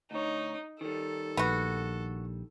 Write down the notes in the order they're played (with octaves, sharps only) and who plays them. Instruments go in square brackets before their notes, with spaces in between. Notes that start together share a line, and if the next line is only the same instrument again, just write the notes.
[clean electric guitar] D2 C#5 [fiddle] D#4
[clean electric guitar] D#3 G3 [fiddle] A4
[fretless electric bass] A#1 [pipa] B3 F#4